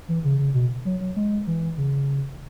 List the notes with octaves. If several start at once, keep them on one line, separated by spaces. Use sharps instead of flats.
E3
C#3
C#3
B2
F#3
F#3
G#3
E3
C#3